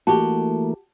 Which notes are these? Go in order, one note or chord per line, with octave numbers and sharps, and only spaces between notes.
E3 A3 A#3 F#4 G4 A5